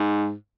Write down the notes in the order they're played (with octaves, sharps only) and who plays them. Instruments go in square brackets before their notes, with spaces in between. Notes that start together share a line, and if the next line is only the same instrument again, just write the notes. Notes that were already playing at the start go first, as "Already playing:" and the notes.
Already playing: [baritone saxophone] G#2